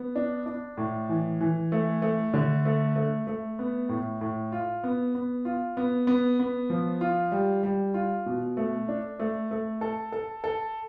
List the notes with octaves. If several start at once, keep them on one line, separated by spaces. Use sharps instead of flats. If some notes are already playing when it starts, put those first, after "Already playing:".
Already playing: B3
D4
D4
A2
E3
E3
A3
A3
D3
A3
A3
A3
B3
A2
A2
F4
B3
B3
F4
B3
B3
B3
F3
F4
G3
G3
F4
B2
A3
D4
A3
A3
A4
A4
A4